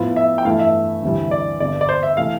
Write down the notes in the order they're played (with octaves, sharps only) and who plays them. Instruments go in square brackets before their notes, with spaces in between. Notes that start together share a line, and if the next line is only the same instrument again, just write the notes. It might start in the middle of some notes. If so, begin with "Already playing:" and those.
Already playing: [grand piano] A2 F3 B3 F4
[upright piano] E5
G5
[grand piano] G2 E3 A3 E4 [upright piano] F5
[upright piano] E5
[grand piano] D2 C3 E3 G3
[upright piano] D5
[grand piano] G1 G2 D3 [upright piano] D5
[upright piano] D5
C5
E5
[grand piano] C3 E3 A3 [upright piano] F5